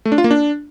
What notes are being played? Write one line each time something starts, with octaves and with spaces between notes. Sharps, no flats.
A3
D4
F4
A#3
D4